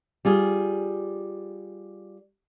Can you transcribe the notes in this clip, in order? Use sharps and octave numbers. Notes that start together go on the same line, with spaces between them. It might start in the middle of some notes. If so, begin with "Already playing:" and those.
G3 F4 G#4